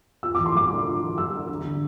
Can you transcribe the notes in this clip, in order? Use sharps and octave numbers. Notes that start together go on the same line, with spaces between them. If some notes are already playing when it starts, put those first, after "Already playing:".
F4 E6
E3 D6
C6
G3 D6
D4
F4
E3
G3 E6
D4
D3
D3